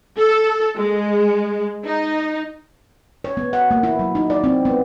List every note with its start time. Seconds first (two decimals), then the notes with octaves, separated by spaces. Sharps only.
0.18 A4
0.77 G#3
1.86 D#4
3.24 C#5
3.37 B3
3.53 F#5
3.71 A#3
3.83 E4
3.99 F#3
4.15 D#4
4.30 D5
4.44 C4
4.65 B3